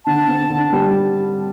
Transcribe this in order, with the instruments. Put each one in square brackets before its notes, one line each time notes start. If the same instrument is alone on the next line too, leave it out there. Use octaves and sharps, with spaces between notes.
[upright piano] D3 [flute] A5
[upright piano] C4
D3
G3